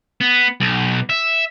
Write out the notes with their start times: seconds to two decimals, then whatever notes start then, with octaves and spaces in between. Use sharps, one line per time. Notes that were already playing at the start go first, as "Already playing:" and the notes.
0.21 B3
0.60 B1
1.09 E5